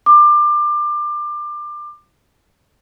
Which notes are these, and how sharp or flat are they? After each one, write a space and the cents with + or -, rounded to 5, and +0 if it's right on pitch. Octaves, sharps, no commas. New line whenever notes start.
D6 +25